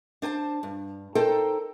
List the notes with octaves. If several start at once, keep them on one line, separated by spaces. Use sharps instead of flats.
D4 C5 G#5 A5
G2
D#4 A4 A#4 C5 G5